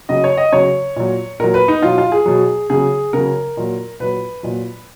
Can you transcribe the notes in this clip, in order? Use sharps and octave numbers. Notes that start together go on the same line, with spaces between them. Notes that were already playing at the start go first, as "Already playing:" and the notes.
C#3 F#3 D#5
C#5
D#5
C#3 F#3 C#5
A#2 F#3
A#2 F#3 A#4
B4
D#4
B2 F#3 F4
F4
G#4
B2 F#3
C#3 F#3 G#4
C#3 F#3 A#4
A#2 F#3
A#2 F#3 B4
A#2 F#3